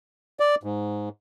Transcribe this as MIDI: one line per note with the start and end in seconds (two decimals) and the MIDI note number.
0.40 0.55 74
0.64 1.09 44